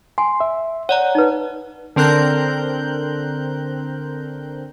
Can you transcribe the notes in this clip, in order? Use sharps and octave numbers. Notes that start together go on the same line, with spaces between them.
G#5 C6
E5
C#5 D5 F#5 A#5
D#4 B4
D3 C4 A#4 F#6 G6